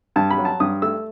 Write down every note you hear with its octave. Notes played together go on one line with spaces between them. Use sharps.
G2 A5
B5
F#3
A5
G2 D#6
A3 E6